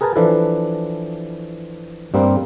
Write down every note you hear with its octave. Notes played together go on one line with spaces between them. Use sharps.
G#4 A#4 B4 G#5 A5
E3 F3 D4 A4 B4
G2 G3 A#3 C4